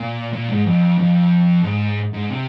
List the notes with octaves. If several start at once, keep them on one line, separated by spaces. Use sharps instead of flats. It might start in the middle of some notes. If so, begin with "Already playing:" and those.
Already playing: A#2
A#2
G#2
F2
F2
G#2
G#2
C3